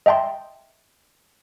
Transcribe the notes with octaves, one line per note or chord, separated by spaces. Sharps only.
D#5 E5 G5 A5 C6